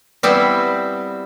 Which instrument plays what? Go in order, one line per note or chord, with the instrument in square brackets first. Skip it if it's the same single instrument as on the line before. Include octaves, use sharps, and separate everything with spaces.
[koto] G3 B3 C4 E4